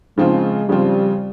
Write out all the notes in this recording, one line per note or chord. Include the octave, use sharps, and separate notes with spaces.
C#3 F3 G#3 C4 F4
C#3 F3 G3 C4 F4